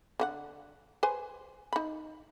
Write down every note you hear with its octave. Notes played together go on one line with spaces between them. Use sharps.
D3 F#4 F#5
B4 C5 G#5
D#4 B5